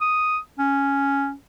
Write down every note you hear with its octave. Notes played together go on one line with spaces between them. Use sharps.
D#6
C#4